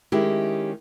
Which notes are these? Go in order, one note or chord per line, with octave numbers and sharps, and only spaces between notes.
D#3 G#3 C#4 E4 G4